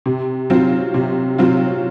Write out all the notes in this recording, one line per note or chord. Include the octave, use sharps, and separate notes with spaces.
C3
F#3 C4 F4
C3
F#3 C4 F4